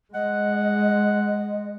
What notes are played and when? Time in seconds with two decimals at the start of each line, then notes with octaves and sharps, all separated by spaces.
0.14 G#3 D#5 F#5